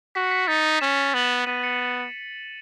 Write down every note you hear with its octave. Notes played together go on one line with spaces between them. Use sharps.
F#4 B6
C#7
B6
D#4 A6
C#4 E7
B3 F#7
E7
B3 D#7
C#7
A6